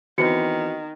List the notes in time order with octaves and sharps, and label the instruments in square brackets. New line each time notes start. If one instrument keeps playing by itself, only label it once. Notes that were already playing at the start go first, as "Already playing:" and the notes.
[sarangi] D#3 [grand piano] E3 B3 C4 [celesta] F#4 C#7